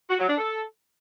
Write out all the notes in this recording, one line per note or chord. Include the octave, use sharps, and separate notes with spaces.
F#4
F#3
D4
A4